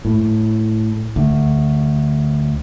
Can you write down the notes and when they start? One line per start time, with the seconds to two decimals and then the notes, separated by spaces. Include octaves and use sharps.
0.05 A2
1.16 D2